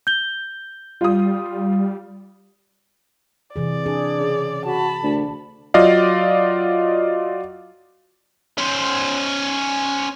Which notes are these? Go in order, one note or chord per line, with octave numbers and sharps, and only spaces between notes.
G6 G7
G3 F4 D#6
C3 E3 G#4 D5
D4 G#4
C#3
F#4 A5 B5
D2 D4
F#3 F4 D5 D#5 F5
C#4 C5